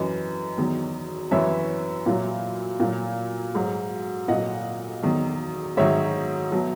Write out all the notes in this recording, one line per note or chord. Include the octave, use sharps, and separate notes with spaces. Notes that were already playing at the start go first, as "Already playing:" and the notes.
Already playing: F#2 E3 D#5
E2 D#3 F#3
F#2 E3 C#5 E5
A#2 F#3
A#2 F#3
G#2 F#3
A#2 F#3 D#5 F#5
E2 D#3 F#3
G#2 D#3 F#3 C#5 E5
B2 F#3